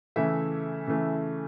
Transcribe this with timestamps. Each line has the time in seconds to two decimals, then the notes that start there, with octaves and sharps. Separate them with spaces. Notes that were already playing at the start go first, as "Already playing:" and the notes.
0.16 C#3 E3 A3 E4 E5
0.87 C#3 E3 A3